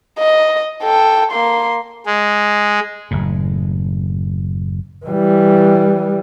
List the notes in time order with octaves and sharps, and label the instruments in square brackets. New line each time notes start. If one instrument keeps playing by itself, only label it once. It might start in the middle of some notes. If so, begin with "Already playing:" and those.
[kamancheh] D#5
A4 G5
A#3 C6
[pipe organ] G#3
[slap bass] F#1 A2
[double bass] E3 G3